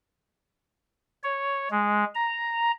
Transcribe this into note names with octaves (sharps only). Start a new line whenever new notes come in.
C#5
G#3
A#5